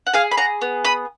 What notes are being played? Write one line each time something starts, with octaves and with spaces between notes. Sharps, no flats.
F#5
G#4 F5 G#5
B5
F#5 A#5
B3
B5 D#6